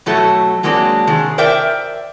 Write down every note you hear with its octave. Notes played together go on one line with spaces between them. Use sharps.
B2 F#3 A3 A4 E5
F#3 G#3 A#3 C4 D4 F#4
C3 D#3 G#4
A#4 C5 D5 E5 G5